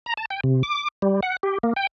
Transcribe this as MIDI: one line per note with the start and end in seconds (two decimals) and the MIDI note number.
0.06 0.14 82
0.17 0.25 81
0.30 0.40 79
0.44 0.63 48
0.63 0.88 86
1.02 1.20 55
1.23 1.37 78
1.43 1.58 67
1.63 1.73 58
1.76 1.87 79